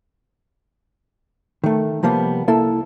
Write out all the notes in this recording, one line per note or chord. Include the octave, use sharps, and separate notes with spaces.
D#3 A3
C3 F3 G3 A#3 B3
C2 A#3 E4 A4